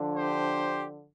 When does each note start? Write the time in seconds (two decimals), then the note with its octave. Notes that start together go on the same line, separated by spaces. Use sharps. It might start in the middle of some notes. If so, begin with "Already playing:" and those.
Already playing: D3 F3 D4
0.15 G4 C5